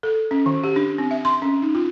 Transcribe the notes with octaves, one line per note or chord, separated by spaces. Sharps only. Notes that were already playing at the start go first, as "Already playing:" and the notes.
A4
C#4
D#3
G4
D4
C4
E5
C6
C#4
D#4
F4